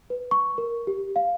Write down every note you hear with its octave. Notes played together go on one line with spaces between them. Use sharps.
B4
C#6
A#4
G4
F5